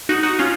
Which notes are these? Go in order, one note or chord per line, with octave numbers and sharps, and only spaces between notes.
D#4 F#4
D#4 F#4
C#4 F4